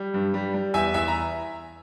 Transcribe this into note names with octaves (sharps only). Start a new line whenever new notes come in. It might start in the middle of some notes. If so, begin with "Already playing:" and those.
Already playing: G3
G2
G3
G3
E2 E5 G#5
E2 E5 G#5
A#5